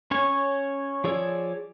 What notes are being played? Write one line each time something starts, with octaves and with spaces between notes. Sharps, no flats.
C#4 C#5 G#5
F3 G#4 C#5 D5 E6